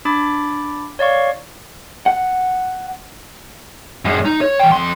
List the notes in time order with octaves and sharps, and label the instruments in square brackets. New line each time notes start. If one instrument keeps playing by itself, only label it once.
[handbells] D4 B5 D6 A6
C#5 D5 F5 C#6
[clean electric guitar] F#5
[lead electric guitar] F#2 G#3
D#4
C#5
E3 G5
F2 C6